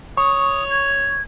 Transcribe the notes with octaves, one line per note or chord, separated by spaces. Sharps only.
C#5 C#6 D#6
G#6